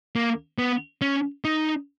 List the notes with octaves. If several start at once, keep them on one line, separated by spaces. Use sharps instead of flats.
A#3
B3
C#4
D#4